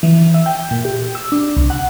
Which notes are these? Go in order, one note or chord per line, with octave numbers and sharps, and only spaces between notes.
E3
E5
G5
A#2
G4
E6
D4
C2
F#5